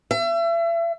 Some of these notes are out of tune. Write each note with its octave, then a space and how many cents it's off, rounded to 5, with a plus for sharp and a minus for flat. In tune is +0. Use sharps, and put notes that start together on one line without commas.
E5 +35